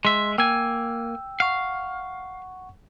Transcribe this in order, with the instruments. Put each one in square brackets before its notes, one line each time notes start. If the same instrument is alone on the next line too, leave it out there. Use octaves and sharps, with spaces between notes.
[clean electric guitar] G#3 E5 [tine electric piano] C6
[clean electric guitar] A#3 G#5 [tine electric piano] G5 E6
[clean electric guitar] F5 [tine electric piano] F#5 C#6